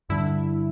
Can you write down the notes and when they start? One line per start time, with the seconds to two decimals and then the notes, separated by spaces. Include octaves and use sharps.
0.09 G2 D3 G3 D4 E4